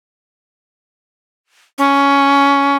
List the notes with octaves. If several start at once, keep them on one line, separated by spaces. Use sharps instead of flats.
C#4